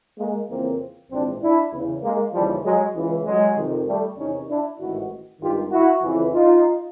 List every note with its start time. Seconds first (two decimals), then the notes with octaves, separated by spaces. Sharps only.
0.19 G#3 A#3
0.49 F2 C#3 E3 A#3 C4
1.11 A#1 G#2 E3 C4 D4
1.42 D4 E4
1.72 E2 C#3 E3
2.03 G#3 A#3
2.33 D#2 C#3 E3 F3 G3
2.64 F#3 G#3
2.95 C#2 C#3 E3
3.25 F#3 G#3
3.57 F2 C3 D#3
3.87 G3 A3
4.18 E2 C3 D#3 C#4 D#4
4.48 D4 E4
4.79 A1 G#2 D#3 E4 F#4
5.41 G#1 G2 D#3 F4 G4
5.71 E4 F#4
6.02 F2 C#3 E3
6.33 D#4 F4